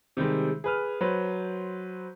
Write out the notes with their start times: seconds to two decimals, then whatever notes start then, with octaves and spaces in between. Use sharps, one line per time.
0.17 C3 D#3 G3 G#3
0.64 G#4 B4 F6
1.01 F#3 B4 C5